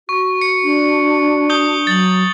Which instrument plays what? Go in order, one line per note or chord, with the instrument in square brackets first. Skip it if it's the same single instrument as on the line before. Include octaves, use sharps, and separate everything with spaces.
[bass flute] F#4 [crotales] C#6
[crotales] C#7
[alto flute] D4
[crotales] D#6 G6 G7
[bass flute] F#3 [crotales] A6 F#7